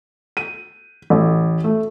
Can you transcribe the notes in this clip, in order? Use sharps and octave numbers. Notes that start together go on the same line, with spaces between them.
D#7
A1
A3